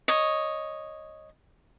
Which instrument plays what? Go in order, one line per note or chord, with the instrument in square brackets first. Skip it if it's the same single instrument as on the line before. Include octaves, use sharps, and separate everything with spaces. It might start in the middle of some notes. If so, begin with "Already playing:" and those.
[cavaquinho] C#5 D#5